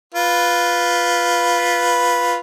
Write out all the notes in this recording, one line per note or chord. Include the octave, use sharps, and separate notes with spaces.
F4 B4